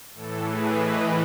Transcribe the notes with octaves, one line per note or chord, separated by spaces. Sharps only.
A2 E3 A4
G#4 B4
B4 D#5